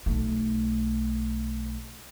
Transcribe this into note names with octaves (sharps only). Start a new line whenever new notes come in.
B1 A3